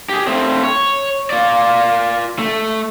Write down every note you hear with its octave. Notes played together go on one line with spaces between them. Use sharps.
G4 G#4
A3 C4
C#5
F4 D5
A3